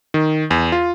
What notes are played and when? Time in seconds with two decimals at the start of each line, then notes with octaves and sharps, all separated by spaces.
0.14 D#3
0.51 E2
0.72 F4